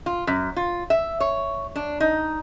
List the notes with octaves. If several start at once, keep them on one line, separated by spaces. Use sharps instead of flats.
F4
F#2
F4
E5
C#5
D4
D#4